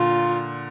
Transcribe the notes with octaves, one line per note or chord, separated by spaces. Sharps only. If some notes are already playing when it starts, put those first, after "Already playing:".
Already playing: A#2 D3 F4